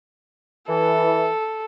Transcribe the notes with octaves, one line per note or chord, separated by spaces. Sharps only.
E3 A4